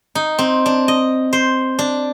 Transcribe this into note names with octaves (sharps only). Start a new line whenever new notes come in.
D#4
C4
D4
D#5
C5
D4